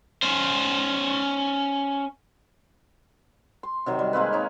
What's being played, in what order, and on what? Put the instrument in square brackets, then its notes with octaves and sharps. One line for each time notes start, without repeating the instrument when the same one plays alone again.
[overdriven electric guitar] C#4 C5
[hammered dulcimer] C6
C3 D#3 F#3
G3
G#3 A#3 C4 B4
D#4 C#5